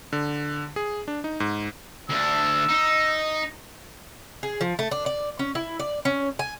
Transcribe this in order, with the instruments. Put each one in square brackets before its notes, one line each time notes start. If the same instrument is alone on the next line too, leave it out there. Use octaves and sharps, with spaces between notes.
[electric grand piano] D3
G#4
D4
D#4
G#2
[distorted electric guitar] D2 D4 [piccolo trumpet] E6
[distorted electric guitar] D#4
[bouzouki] G#4
F3
A3
D4
D5
C#4
E4
D5
C#4
G#5